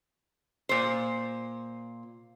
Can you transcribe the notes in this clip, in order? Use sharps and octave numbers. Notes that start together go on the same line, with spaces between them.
A#2 C5